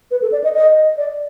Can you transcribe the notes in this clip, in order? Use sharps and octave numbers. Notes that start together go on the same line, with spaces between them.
B4
A4
D5
D#5
D#5
D5